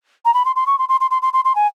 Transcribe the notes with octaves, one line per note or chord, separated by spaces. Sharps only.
A#5
B5
C6
C6
C#6
C6
C6
C6
C6
C6
C6
C6
G#5